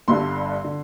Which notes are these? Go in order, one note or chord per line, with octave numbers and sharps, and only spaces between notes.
G1 G2 D3 C6
D3